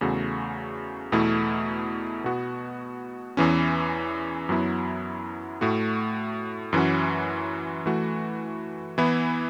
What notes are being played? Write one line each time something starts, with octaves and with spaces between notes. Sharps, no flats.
E2 C#3 A3 F#4
E2 B2 A3 E4
B2 B3 F#4
E2 E3 C#4
F#2 F#3 B3 E4
A2 A3 F#4
F#2 E3 C#4 F#4
E3 A3 F#4
E3 B3 E4